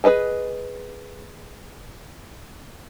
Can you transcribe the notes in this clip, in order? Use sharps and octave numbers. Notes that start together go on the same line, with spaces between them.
G#4 A4 B4 D#5 G#5